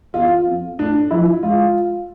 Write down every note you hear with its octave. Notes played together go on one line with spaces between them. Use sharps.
E2 F4
F2
A2 D4
F3 E4
G#3 F4